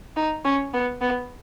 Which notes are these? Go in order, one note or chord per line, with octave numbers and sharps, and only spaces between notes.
D#4
C#4
B3
B3